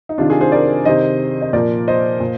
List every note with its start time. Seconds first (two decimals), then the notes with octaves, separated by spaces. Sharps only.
0.09 D#4
0.18 C3 D#3 D4 F4
0.30 F4 G#4
0.41 G#4 C5
0.52 A#4 D5
0.85 C3 D#3 C5 D#5
1.42 D#5
1.53 A#2 F3 A#4 D5
1.88 C5 D#5
2.20 A#2